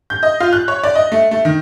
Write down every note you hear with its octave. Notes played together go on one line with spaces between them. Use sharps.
G6
D#5
F4
F#6
C#5
D5
D#5
A3
A3
D#3